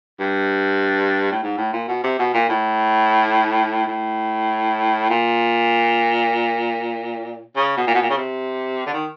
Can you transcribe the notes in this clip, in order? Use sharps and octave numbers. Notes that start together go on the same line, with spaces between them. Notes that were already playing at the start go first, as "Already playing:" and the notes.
G2
A2
G#2
A2
A#2
B2
C3
B2
A#2
A2
A2
A#2
C#3
B2
A#2
B2
A#2
C#3
C3
D3
D#3